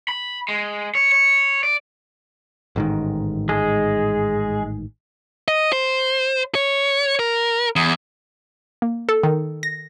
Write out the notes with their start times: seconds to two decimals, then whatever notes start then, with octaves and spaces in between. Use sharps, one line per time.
0.08 B5
0.48 G#3
0.95 C#5
1.12 C#5
1.63 D5
2.76 A1 G#2 D#3
3.49 G#3 G#4
5.48 D#5
5.73 C5
6.55 C#5
7.19 A#4
7.76 E2
8.82 A#3
9.09 A4
9.23 D#3
9.63 A#6